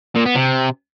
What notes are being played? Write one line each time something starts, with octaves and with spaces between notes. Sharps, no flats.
A#2
B3
C3